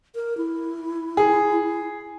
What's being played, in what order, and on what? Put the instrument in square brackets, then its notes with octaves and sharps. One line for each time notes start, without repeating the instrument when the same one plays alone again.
[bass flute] A#4
E4
[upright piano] G#4